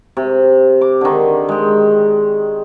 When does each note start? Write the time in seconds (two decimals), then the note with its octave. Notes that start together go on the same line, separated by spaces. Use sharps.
0.17 C3
0.81 D6
1.01 D3 D#3
1.49 G#3 G5